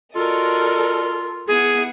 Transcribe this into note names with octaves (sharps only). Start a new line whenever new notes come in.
F4 F#4 A4 A#4 D5 D#5
B3 E4 G#4 F#5